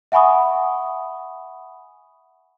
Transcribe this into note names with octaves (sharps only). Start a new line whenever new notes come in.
E5 F#5 G#5 B5 C#6 D#6